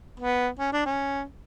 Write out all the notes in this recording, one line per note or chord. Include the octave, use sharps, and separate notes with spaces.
B3
C#4
D4
C#4